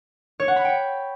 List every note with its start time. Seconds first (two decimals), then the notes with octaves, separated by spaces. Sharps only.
0.40 C#5
0.48 F#5
0.56 B5
0.65 G5